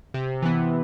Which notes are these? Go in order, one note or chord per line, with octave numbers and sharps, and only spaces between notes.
C3
E3 B3